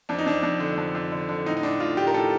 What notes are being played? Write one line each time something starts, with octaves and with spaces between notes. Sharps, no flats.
F2 D4
D#4
F2 D4
F2
D3
F2
F2
D3
D3
A2 D#4
D#4
A2 D4
A2 F4
A2 G4
A#4
A2 A4